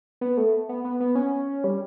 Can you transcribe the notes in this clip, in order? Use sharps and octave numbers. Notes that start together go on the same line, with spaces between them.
B3
A3
B3
B3
B3
C#4
G3